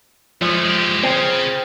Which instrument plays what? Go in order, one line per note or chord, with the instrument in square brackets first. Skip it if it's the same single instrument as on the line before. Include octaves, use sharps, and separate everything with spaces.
[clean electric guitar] F3 [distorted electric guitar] G#3 A3
[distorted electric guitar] G#3 G4
[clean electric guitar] C4 [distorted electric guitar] G#4 F5